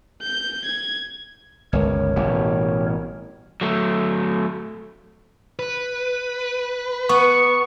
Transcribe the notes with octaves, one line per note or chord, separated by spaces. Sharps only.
G6
G#6
G1 C#2 A#4 C#5
A1 B2 G3
F#3 A3
B4
B3 C#6